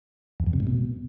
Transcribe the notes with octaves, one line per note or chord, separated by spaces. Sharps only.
E2
F2
C3
G#2
B2